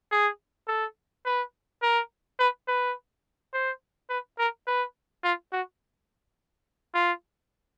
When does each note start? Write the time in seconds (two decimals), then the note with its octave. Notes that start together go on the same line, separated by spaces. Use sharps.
0.11 G#4
0.68 A4
1.25 B4
1.82 A#4
2.39 B4
2.68 B4
3.53 C5
4.09 B4
4.39 A#4
4.67 B4
5.24 F4
5.53 F#4
6.94 F4